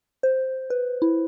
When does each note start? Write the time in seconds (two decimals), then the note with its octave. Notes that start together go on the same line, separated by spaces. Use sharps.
0.23 C5
0.70 B4
1.02 E4